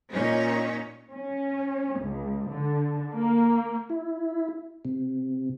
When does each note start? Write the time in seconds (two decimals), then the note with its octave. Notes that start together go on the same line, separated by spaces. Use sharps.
0.11 A#2 C#4 D#4 C#5
1.13 C#4
1.98 C#2
2.48 D3
3.13 A#3
3.90 E4
4.85 C3